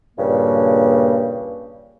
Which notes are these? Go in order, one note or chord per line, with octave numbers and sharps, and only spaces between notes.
G2 A#2 C#3 A#3